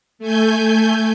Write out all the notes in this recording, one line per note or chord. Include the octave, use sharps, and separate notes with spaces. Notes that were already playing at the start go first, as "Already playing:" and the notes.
A3 G#5 G6